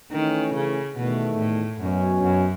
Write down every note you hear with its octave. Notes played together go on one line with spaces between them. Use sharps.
D#3 E3 A3 C#4
C#3
E2 B2 D#3 A3
A2
F#2 B2 F#3 C#4
F#2